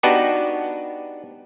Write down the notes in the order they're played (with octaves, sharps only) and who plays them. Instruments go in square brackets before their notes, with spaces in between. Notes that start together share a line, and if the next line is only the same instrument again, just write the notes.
[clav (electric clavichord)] B3 D4 D#4 F#4 G4 B4